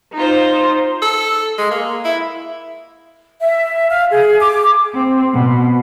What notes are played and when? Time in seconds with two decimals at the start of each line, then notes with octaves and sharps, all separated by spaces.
0.13 D#4 F4 C5
1.02 A4
1.58 G#3
1.71 A#3
2.05 E4
3.40 E5
3.90 F5
4.10 G#4
4.40 D6
4.94 C4
5.33 B2